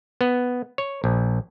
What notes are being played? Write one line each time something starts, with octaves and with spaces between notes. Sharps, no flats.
B3
C#5
A#1